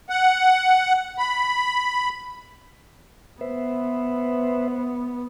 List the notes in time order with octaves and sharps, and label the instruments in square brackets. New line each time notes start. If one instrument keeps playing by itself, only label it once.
[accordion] F#5
B5
[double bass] B3 [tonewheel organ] B4 C5 E5